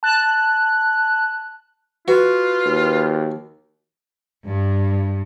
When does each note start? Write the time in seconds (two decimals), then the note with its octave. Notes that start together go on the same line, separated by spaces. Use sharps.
0.03 A5 F#6
2.08 F4 F#4 B4
2.65 D#2
4.46 G2